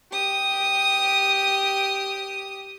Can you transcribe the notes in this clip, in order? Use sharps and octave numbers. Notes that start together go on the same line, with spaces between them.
G4 D#6